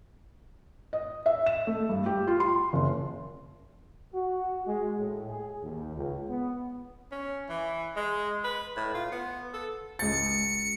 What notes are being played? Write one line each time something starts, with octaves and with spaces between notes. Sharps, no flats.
D#5
E5
E7
A3
G2
G4
F4
C6
F#1
F#4
G#3
A2
G#4
D#2
C#2
B3
C#4
E3
G#3
B4
A2
F4
B3
A4
C#2 A6 C#7